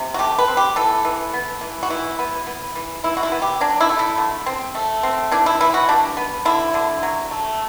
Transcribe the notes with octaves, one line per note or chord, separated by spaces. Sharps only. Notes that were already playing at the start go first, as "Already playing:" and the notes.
Already playing: C3
F#4
A3 G4
B4
C4
G4
E3 A4
E3
B3
E3
F#4
E3 E4
B3
B3
E3
E3 E4
F#4
E4
B3
G4
F#3 D4
E4
A3
E4
D3
C4
A3
C4
E3 D4
E4
E3 E4
F#4
G3 D4
B3
D3 E4
D3
F#3
A3